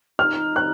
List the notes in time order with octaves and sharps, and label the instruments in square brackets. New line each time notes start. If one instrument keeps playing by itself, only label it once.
[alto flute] D#4 [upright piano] F6
[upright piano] F#6